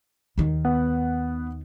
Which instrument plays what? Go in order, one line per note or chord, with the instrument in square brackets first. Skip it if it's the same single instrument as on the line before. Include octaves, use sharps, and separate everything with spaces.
[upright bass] D#2 D#3
[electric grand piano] B3 F#5